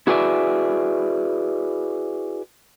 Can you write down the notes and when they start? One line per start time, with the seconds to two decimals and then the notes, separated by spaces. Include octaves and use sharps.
0.07 E4 F#4 G#4 B4 D5 E5